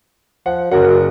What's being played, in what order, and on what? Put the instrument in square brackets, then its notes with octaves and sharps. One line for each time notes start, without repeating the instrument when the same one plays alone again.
[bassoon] F3 [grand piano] F#5
[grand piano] F#1 A#4 F#5 [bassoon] F#2 [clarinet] F#4